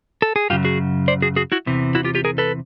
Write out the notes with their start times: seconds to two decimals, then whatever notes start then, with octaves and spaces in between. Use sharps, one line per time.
0.22 A4
0.36 G#4
0.50 F#2 C#3 F#3 F4 G4
0.65 F#4 G#4
1.08 C5 D5
1.22 F#4 G#4
1.36 F#4 G#4
1.52 E4 F#4
1.66 E2 C3 E3
1.95 E4 F#4
2.04 F4 G4
2.15 F4 G4
2.25 G#4 A#4
2.38 A4 B4